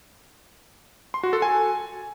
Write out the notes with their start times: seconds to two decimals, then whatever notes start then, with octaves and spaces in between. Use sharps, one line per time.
1.14 C6
1.23 F#4
1.33 A4
1.42 G#5